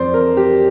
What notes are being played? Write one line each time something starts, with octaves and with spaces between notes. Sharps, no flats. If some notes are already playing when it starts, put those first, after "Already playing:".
Already playing: F2 C5 D5
A#4
G4